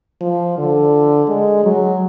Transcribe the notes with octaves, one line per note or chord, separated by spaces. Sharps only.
F3
D3
G#3
F#3